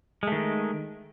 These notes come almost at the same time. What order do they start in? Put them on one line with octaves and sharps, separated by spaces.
G#3 A3 D#3